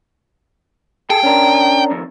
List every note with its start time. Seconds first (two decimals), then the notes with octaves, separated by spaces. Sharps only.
1.10 G#4 A4 G5
1.23 C#4 D4 A#4
1.91 F2 D#3